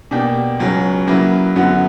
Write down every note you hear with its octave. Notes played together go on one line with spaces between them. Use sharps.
B2 A#3 D4 G4
C#2 C#3 F#3 C#4
C#3 F#3 A#3 E4 B4
F#2 D3 F#3 B3 F#4